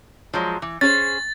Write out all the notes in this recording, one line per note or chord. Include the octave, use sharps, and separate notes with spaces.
F3 F#3 G#3
E3
C#4 G#4 C5 A6